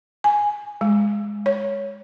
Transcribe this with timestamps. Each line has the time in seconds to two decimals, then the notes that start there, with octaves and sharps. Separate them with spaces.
0.24 G#5
0.81 G#3
1.46 C#5